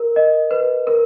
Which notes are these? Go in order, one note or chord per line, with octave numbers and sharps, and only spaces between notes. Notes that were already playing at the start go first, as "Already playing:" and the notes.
Already playing: A#4
D#5
B4
A#4